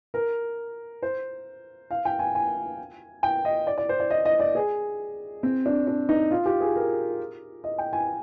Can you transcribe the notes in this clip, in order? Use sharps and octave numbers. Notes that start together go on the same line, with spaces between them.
A#4
C5
F5
G5
G#5
G#5
G5
D#5
D5
D5
C5
D5
D#5
D#5
D5
G#4
C4
D4
D4
D#4
F4
G4
G#4
A#4
D#5
G5
G#5